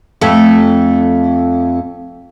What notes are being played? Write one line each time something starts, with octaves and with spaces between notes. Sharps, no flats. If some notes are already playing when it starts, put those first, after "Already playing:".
F2 A3